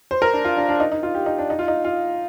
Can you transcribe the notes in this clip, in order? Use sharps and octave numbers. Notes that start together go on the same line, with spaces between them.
C5
A#4
D4
F4
D4
D4
D#4
D#4
F4
G4
D#4
D4
D#4
F4
D#4
F4